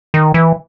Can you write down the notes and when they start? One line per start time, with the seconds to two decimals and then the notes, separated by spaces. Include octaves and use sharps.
0.14 D#3
0.34 E3